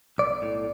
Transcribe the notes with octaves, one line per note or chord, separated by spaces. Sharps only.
B1 D5
A2